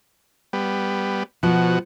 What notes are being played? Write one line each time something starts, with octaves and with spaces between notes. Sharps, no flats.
G3 B3
B2 F3 F#4